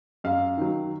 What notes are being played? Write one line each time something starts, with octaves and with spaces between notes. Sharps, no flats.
F#2 F5
D#3 F#3